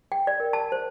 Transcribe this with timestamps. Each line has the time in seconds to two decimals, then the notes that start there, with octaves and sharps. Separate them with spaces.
0.12 G5
0.27 D5
0.40 A#4
0.53 A5
0.72 C5